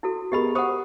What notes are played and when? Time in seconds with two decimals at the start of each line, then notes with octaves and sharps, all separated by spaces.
0.03 E4 F#4 A4
0.32 B3 G4 G#4 A#4 D#5 B5
0.55 C5 F#5 C#6 D#6